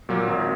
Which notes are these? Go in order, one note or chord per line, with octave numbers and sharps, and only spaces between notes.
A#2 F#3 A#3
G#1